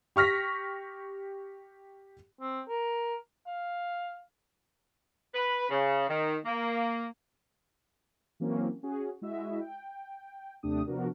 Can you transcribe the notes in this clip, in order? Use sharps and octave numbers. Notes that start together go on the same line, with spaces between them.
G4 C#6 F6 A#6 B6
C4
A#4
F5
B4
C#3
D#3
A#3
E3 F#3 A#3 C4 C#4
C#4 F#4 G#4
G#3 E4 F#4 D#5 E5
G5
D#2 C3 A3 D4 G4 D#6
C3 F3 B3 D4 F#4 A#4